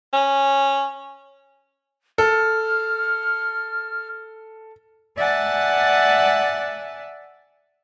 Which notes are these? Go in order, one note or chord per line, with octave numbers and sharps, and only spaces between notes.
C#4
A4 F6
D5 E5 F#5 G#5 A5